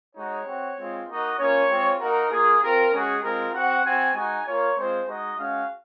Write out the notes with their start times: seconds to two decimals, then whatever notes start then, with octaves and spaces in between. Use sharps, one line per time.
0.16 G#3 D#4 F#4 C#5
0.46 C4 F#4
0.77 G#3 C4 F4
1.07 A#3 D#4 F#4 D#5
1.38 A#3 C#4 F4 C#5
1.69 G#3 C4 F4
2.00 A#3 D#4 F#4 A#4
2.30 A#3 F4 G#4
2.61 C4 F4 A#4
2.92 G#3 C#4 F#4 G#4
3.22 G#3 C4 F4 A#4
3.53 C4 F#4 F#5
3.84 C4 F#4 G#5
4.14 G#3 D#4 F#4 G#5
4.45 A#3 F4 C#5
4.76 G#3 C4 F4 C5
5.06 G#3 D#4 F#4 D#5
5.37 G#3 C#4 F#4 F5